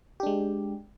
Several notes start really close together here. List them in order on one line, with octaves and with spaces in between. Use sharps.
G4 D4 G#3